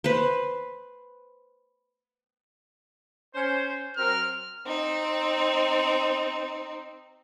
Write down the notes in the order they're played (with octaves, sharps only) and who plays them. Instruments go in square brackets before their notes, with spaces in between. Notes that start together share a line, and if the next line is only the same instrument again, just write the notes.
[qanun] B4 C5
[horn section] C#4 C5
[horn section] F#3 C4 A#4 [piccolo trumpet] F6
[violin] C4 D#4